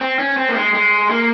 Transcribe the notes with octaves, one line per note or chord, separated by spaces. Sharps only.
C4
C#4
C4
A#3
G#3
G#3
A#3